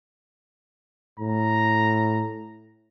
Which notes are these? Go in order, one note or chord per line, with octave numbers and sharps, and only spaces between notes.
A2 A#5